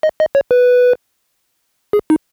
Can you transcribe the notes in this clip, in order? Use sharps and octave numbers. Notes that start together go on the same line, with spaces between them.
D#5
D#5
C#5
B4
G#4
D#4